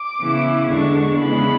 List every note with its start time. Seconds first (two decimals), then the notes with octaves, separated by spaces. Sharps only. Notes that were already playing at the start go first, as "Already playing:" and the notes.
Already playing: D6
0.20 C#3 E3 B3 E4
0.69 E2 D3 G#3 D4 C#6
1.19 C#3 E3 G#3 B3 D4 B5